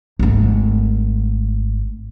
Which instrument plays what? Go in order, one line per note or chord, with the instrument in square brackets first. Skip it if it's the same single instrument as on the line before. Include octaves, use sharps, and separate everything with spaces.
[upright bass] G#1 A3